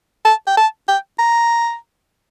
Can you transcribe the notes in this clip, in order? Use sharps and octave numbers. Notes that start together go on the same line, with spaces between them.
A5
G5
A5
G5
A#5